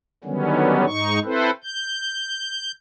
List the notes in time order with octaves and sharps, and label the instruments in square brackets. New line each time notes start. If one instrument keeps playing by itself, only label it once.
[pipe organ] D3 D#3 F#3 G3 B3 C#4
G#2 D#4 C#6
C4 E4 A4 B4 C5
G6